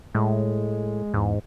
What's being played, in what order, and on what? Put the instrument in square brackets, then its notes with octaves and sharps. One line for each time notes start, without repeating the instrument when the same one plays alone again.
[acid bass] A2 [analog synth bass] G#3
[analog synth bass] E2 [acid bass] G#2